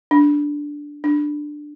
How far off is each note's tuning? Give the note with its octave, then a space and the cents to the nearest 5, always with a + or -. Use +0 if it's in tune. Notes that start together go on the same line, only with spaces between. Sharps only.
D4 -5
D4 +10